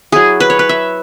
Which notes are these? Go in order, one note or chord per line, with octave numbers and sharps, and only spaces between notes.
F#3 E4 G#4
B4
C#5
B4
E5